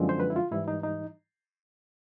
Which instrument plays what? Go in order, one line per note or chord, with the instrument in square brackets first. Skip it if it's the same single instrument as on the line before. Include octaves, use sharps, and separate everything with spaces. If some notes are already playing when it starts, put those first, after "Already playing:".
Already playing: [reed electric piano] F#2 D3 F3 G#3 C4
C5
B4
E4
F4
G#2 E3 G3 E4
D#4
D#4